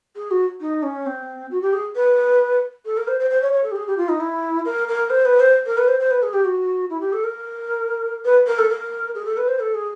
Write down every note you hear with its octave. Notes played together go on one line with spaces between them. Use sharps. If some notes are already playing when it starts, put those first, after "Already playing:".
G#4
F#4
D#4
C#4
C4
F#4
G4
G#4
B4
A4
A#4
C5
C5
C5
C#5
C#5
A4
G4
G#4
G4
F4
D#4
E4
A#4
A#4
C5
B4
C5
A#4
B4
C5
C5
B4
G#4
G4
F#4
E4
G4
A4
A#4
B4
A#4
A4
A#4
G#4
A4
B4
C5
A4
G#4